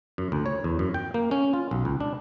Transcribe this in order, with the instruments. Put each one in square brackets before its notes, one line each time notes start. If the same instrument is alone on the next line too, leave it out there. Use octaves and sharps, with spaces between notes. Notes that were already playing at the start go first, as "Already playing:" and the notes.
[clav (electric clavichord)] F#2
D2
C#5
E2
F#2
G5
A#3
C#4
F4
B1
C#2
D4